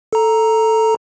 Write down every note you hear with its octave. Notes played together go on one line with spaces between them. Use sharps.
A4 A#5